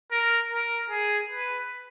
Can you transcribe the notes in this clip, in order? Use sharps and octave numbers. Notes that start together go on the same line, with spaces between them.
A#4
A#4
G#4
B4